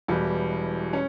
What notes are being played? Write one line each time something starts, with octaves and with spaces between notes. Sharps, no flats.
E1 E2 B2 G3
C#4